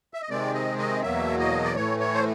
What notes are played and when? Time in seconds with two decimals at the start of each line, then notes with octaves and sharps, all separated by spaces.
0.14 E5
0.22 D#5
0.30 C3 D#3 G#3 C4 D5
0.54 D#5
0.78 D#5
1.02 E2 B2 F#3 A#3 E5
1.39 D#5
1.65 D5
1.76 A2 E3 A3 C#5
2.00 C#5
2.14 C5